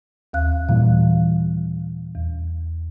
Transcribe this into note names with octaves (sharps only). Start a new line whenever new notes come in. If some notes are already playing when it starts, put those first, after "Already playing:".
D#2 F5 F#6
A#2 E3 G3 F5
E2